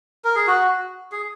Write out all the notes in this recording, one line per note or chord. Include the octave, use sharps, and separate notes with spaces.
A#4
G#4
F#4
G#4